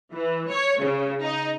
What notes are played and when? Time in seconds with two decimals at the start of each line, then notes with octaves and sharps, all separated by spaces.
0.12 E3
0.48 C#5
0.80 C#3
1.23 D#4